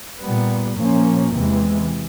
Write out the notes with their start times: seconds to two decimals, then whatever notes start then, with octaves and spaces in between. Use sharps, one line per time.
0.21 A#2 G3 B3
0.77 A#2 F3 A#3 C#4
1.33 E2 C3 E3 G#3